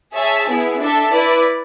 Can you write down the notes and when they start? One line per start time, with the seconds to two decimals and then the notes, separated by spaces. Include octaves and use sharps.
0.15 G#4 C#5 E5 A5
0.48 B3 E4 G#4
0.81 D4 A4 E5 A5
1.13 E4 B4 D5